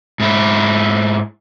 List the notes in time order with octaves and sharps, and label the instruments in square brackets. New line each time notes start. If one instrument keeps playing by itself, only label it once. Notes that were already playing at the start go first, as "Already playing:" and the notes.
[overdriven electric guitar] G#2 E4